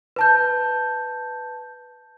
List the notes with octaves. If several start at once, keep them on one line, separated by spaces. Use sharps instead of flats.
B4 A5 G6